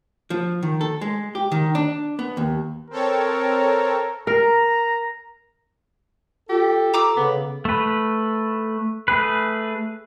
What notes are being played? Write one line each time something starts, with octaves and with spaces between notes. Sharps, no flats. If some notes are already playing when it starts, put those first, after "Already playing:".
F3
D#3
A4
G#3
G4
D#3
D4
B3
D#2
C4 A4 A#4 C#5
A#4 A#5
F4 G4 A4
A4 A#5 D6 E6
C#3 B3
A3 B4
A3 G#4 B4